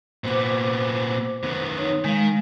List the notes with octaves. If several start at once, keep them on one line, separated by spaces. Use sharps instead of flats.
A#2 B3 C5 D6
D#3 B3
D#4 C#5
D#3 G#3 F5